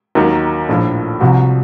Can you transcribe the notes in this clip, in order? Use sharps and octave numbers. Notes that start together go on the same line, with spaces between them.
D#2 D#3 F#3
A#1 A2 F3
C2 C3 F3 F#4